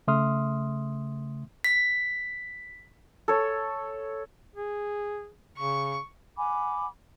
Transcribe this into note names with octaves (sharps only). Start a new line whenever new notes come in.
C#3 A3 E5 C6 D#6 F6
B6
A4 C#5
G#4
C#3 C#6
F#5 G#5 B5 D6